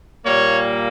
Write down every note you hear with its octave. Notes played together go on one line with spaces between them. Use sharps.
A#2 G3 A#3 C#5